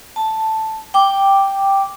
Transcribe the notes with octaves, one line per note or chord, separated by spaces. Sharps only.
A5
G5 D6